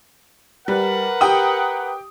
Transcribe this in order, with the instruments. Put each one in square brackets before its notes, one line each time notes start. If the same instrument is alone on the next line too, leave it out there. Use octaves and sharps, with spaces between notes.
[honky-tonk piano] G3 [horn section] A#4 B4 F#5
[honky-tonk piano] G4 G5 D#6